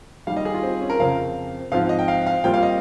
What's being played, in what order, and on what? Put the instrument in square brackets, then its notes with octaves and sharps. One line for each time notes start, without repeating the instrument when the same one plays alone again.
[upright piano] D#2 D#3 G3 [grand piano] F5
[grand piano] D#5
G#4
F4
C4
C#4
A#4
[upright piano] F2 C#3 F3 C4 [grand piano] F5
[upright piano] G#2 F3 C4 F4 [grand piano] F5
[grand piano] D#5
G5
F5
F5
[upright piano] A#2 G3 C4 F4 [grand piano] G5
[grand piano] F5
D#5